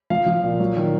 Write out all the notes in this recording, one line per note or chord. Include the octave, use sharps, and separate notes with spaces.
F3 F5
F3
A#2
F#3
D#3